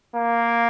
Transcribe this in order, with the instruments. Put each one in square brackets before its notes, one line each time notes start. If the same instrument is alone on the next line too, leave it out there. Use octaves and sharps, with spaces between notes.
[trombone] A#3